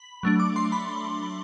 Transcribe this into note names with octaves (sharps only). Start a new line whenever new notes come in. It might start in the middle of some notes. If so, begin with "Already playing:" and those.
Already playing: B5
F#3 A3 D4
D6
C6
B5